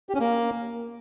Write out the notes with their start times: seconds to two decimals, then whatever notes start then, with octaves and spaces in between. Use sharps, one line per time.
0.09 G4
0.15 C#4
0.20 A#3